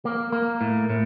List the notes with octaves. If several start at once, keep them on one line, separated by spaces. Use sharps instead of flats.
A#3
A#3
A2
A2